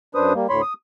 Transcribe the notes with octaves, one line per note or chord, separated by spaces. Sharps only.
F#2 D4 B4 C5 D#6
G3 A#3
D2 A2 C#5 B5 C6
D#6